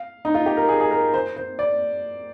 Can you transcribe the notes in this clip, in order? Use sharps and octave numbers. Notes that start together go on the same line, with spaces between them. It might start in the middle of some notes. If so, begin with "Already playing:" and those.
Already playing: F5
D#4
F4
G4
A#4
G#4
G#4
A#4
C5
C5
D5